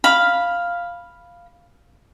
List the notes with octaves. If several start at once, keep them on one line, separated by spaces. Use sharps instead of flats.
F5 B5